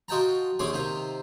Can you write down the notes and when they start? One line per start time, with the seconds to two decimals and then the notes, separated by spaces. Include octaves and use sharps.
0.08 F4 F#4 D#5 G5 A5 A#5
0.59 A#1 D#2 C#4 G#4 C6 D6
0.73 C3 D#3 F4 C5